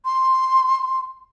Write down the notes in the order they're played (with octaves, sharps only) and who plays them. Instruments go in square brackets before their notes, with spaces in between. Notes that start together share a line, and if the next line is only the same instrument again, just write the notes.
[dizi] C6